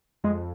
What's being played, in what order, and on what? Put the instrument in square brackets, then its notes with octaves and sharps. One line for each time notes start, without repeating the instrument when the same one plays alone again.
[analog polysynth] F2 [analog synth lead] G#3